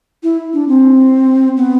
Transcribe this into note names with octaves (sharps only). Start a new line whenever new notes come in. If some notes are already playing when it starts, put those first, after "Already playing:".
E4
D4
C4
B3